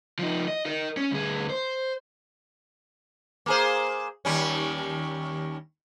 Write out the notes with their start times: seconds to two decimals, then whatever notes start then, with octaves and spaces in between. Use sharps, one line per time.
0.19 F3 D#4
0.48 D#5
0.66 A#4 D#5
0.97 C#4 C#5
1.11 D2 G#4
1.50 C5
3.46 A#3 G#4 C5
4.25 D#2 G3 C#4